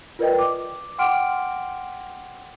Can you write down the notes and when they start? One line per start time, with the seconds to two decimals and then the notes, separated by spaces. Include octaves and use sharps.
0.19 F4 A#4 B4 D5 D#5 G5
0.39 D6
0.99 F#5 G5 C6 D6 F6 D7